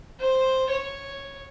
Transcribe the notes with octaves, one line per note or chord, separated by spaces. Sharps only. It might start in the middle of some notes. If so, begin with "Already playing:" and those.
C5
C#5